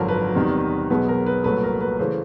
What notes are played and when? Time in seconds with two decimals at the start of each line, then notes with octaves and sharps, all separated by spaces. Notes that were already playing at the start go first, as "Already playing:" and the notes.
Already playing: G#1 F#2 D3 F3 A#4
0.08 B4
0.35 E2 C3 D#3 G3
0.90 B1 B2 G#3 B3 B4
1.08 A#4
1.26 B4
1.44 C2 A#2 F#3 A3 B4
1.63 A#4
1.81 B4
1.99 C#3 E3 A3 C5